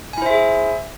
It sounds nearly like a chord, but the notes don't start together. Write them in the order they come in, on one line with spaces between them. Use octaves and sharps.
G#5 E4 C5 E5 G#4